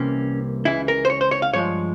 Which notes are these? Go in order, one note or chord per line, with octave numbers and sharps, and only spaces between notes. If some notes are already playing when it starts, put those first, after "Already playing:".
Already playing: C2 C3 E3 A#3 C#4
C#2 C#3 E3 E4
A#4
C5
C#5
C5
C#5
F5
G2 F3 G#3 C#5